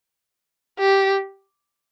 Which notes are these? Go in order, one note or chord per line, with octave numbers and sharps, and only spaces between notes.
G4